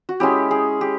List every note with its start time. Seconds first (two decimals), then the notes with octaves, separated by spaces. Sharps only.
0.09 F#4
0.20 G#3 C#4 E4 G4
0.51 G#4
0.81 G4